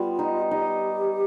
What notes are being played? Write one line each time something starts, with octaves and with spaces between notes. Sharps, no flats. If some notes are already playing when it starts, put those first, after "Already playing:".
Already playing: G3 B3 F4
D#4
D#4 G4